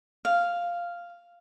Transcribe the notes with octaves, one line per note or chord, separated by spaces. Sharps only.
F5